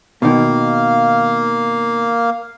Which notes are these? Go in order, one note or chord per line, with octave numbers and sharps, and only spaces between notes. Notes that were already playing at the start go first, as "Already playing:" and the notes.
B2 D#3 A#3 F5